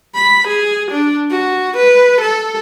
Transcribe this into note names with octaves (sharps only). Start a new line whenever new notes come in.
B5
G#4
D4
F#4
B4
A4